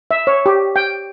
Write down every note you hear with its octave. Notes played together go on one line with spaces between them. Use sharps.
E5
C#5
G4
G5